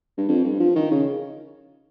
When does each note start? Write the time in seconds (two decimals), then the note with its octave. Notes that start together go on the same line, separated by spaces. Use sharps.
0.18 G2
0.28 F2
0.44 G2
0.60 F3
0.76 D#3
0.91 C#3